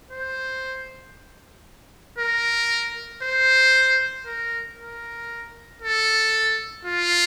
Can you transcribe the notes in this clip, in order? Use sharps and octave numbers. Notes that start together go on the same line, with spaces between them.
C5
A#4
C5
A#4
A#4
A4
F4